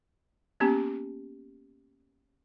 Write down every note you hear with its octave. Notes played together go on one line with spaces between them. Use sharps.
A#3 B3 C#4 G4